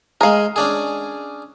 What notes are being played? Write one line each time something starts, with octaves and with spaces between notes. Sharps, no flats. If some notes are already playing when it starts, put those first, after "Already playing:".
G#3 G#4 A#4 F5
C#4 D4 G#4